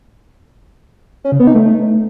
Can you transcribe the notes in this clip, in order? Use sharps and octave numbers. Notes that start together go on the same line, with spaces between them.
C#4
C#3
B3
D#4
A3